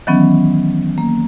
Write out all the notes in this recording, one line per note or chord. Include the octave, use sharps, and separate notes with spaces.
D#3 E3 F#3 B3 C#4
A#3